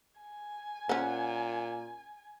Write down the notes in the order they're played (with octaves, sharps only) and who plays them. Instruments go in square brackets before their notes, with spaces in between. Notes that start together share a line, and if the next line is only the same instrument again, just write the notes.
[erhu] G#5
[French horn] A#2 [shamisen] C#4 C5 [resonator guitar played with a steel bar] F#5